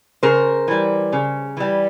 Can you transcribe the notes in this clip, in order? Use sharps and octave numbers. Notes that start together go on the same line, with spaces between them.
C#3 A#4 C5
E3 G3
C#3
E3 G3